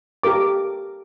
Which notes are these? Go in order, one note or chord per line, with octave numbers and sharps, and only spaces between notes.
G4 A4 A#4 D6